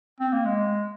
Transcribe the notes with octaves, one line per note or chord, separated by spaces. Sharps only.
C4
A#3
G#3